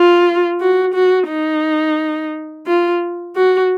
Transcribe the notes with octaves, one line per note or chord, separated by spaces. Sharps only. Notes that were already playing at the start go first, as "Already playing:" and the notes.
Already playing: F4
F#4
F#4
D#4
F4
F#4